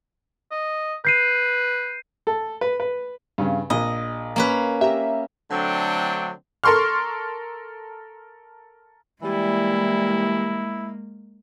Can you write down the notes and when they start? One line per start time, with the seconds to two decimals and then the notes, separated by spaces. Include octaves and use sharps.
0.51 D#5
1.05 B4 G6 C7 D#7
2.27 A4
2.61 B4
2.80 B4
3.38 G2 C#3
3.70 A#1 D#5
4.36 A#3 C#4 B4
4.81 G4 E5 A#5
5.51 D3 F#3 A3 C4 D4 G5
6.64 A4 A#4 C6 C#6 F6
9.22 E3 G3 G#3 A#3 E4